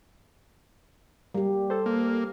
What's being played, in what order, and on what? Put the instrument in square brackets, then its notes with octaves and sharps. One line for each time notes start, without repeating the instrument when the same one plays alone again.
[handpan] G3 G4 [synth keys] A#3
[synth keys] A4 C5
[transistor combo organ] A#3